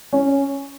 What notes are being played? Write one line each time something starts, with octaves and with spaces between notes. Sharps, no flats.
C#4